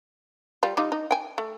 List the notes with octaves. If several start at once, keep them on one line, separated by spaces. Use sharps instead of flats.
G3 F4
G3 D#4 F4
D#4
G5 G#5
A3